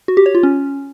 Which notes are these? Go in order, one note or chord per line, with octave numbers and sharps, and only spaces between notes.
F#4
G4
C#5
F4
C#4